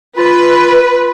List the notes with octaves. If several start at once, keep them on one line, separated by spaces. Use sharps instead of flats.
F4 B4